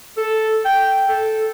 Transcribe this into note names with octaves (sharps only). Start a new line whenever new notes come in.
A4
G5
A4